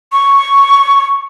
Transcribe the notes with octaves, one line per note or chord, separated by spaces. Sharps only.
C#6